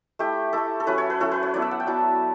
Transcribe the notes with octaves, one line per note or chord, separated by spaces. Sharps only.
A3 E4 G4
A3 E4 A4
A4
F#3 C#4 E4 B4
C#5
B4
F#3 C#4 E4 A4
B4
C#5
F#3 B3 E4 D5
E5
F#5
G5
F#3 B3 E4 A5